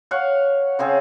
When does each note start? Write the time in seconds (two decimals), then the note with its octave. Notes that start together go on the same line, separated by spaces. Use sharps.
0.11 C#5 F5 F#5 C#6
0.79 C#3 C4 G#4